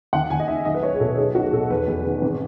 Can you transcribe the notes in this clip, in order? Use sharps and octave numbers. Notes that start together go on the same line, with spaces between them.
D#2 F#5
D#2 G#5
D#5
D#3 E5
B1 D#5
B4
B1 C#5
G#4
B2 A4
B1 G#4
B1 F#4
B2 A4
E2 B4
E2
D#3
G#1